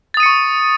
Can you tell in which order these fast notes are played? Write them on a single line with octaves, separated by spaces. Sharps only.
A6 D#6 D#7 C#7 C#6